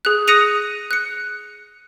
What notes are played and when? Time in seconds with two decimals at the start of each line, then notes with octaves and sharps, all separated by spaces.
0.05 G#4 F#6
0.28 D#6 F#6 A#6 C#7 D#7 F7
0.91 F#6 C#7